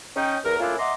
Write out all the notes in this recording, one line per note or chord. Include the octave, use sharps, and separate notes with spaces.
C#4 D#4 G5
E2 A#4
A3 A#3 C#4 D4 E4 F4
D#5 E5 F#5 A#5 C6 D6